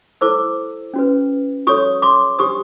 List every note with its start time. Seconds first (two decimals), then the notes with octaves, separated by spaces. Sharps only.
0.21 E4 A4 C5 D6 E6
0.94 C#4 F#4 B4
1.67 F#4 A4 C#5 C#6 D#6
2.02 C6 D6
2.38 D4 G4 C5 C#6 D#6